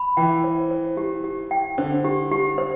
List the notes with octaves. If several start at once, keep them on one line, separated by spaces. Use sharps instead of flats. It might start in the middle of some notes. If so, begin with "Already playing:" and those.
Already playing: B5
E3 G5
C5
C5
G4
G4
G5
D3 C5
G4
G4
C5